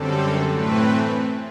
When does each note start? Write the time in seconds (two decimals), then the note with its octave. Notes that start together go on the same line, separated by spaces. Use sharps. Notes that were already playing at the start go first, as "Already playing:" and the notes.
Already playing: F#2 D3 G3 C4 A4
0.48 A2 E3 A3 C4 B4